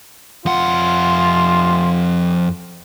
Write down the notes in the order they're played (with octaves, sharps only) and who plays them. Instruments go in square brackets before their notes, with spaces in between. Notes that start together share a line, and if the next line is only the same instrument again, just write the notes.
[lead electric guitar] F2 F#5 [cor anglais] F4